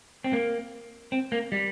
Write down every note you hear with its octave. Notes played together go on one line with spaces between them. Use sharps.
C4
A#3
C4
A#3
G3